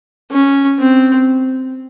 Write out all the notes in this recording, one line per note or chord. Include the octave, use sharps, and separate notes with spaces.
C#4
C4